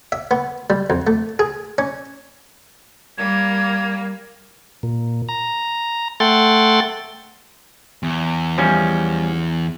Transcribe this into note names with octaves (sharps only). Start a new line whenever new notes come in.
E5
B3
G3
F2
A3
G#4
C#4
G3 A#3 G#6
A#2
A#5
A3 A4 F#5 G5 C6 A6
E2
F3 G3 C#4